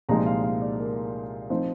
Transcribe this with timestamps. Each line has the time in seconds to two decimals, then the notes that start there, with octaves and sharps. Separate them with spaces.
0.09 C2 A#2 F3 G#3 D#4 A#5
0.26 F5
0.44 F5
0.62 D5
0.79 A#4
1.50 F3 C4 D#4 C5